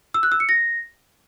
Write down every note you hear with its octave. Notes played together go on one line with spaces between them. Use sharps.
E6
F#6
E6
C#7
A#6